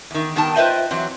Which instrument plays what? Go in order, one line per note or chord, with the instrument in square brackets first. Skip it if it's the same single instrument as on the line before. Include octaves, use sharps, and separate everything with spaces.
[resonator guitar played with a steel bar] E2 D#3
G2 D#3 B3 A#4 G5 A5
F4 B4 C5 D#5 E5 G5
E3 F#3 C4